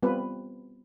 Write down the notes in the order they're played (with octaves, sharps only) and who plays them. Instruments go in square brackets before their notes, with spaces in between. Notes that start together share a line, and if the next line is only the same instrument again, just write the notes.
[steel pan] G3 B3 C4 F4 B4